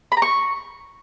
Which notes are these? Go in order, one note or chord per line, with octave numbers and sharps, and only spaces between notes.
B5
A#5
C#6